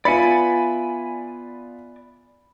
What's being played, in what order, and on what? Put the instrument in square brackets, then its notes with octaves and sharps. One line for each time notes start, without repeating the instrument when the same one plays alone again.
[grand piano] B3 F4 [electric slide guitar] D5 E5 G#5 [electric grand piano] B5 C#7